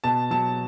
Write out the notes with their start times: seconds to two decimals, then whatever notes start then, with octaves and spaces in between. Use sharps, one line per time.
0.04 B2 A5
0.31 F#3 A5